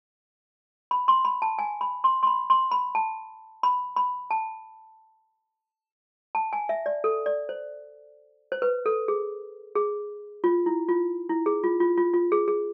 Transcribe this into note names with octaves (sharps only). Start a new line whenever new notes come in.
B5
C6
B5
A5
G#5
B5
C6
C6
B5
C6
B5
A5
B5
B5
A5
A5
G#5
E5
D5
A4
D5
C5
C5
B4
A4
G#4
G#4
F4
E4
F4
E4
G#4
F4
F4
F4
F4
G#4
G#4